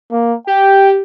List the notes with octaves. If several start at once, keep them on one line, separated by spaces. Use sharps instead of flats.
A#3
G4 G5